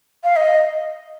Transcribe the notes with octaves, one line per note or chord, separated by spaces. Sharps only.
F5
D#5